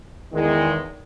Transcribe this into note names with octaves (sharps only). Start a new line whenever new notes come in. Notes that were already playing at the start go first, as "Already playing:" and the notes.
E2 D#3 G#3